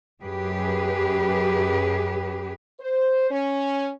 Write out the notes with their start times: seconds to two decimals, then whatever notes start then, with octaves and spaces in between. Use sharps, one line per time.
0.21 F#2 G4 G#4 B4
2.80 C5
3.31 C#4